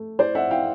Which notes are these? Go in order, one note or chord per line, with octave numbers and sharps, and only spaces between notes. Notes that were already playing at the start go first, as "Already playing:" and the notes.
Already playing: A3
E4 C5 D5
E5 F#5
E4 F5 G5